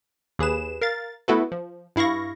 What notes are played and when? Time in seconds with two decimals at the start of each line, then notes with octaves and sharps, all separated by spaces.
0.39 D#2 G#4 B4 E7
0.81 A#4 F5 A6
1.28 A3 B3 E4 F#4 A4 B4
1.52 F3
1.96 G2 E4 F5 C#6 A#6